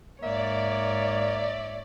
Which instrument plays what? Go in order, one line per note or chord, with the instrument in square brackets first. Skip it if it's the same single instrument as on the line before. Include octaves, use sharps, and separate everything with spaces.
[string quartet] G#2 C#5 [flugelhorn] A#3 [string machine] D5 [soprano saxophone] E5